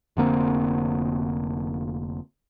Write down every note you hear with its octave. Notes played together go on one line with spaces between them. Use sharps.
F1 D3 A#3 C4